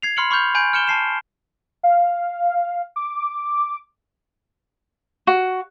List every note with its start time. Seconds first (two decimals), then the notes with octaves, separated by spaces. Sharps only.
0.02 G#6 C7 F7
0.17 B5 C6 F6 C#7 F#7
0.31 B5 C#6 F6 G6 F7
0.55 G#5 B5 G6 D7
0.73 F6 G6 C#7 D7 E7 G7
0.88 A5 C7 E7
1.83 F5
2.96 D6
5.27 F#4